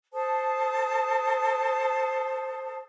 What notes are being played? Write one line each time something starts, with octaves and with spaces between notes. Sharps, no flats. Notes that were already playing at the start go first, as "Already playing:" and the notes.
A4 C5 A5 D#6